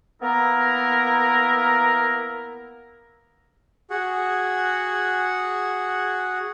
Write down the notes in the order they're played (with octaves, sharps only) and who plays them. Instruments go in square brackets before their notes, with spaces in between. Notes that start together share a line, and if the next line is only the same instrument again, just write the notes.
[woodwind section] A#3 B3 E4 A#4
[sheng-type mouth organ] F#4 G#4 F#5